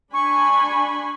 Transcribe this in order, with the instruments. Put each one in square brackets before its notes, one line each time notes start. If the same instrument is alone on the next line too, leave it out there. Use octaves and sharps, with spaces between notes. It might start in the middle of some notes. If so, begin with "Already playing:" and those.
[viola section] D4 G#5 B5 [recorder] C#6